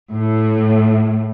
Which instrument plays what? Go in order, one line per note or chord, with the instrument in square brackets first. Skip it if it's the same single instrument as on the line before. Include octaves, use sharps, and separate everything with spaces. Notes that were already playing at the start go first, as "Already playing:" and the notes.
[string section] A2